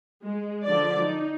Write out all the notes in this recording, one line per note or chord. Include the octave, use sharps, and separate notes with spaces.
G#3
D3 F3 D5
D#4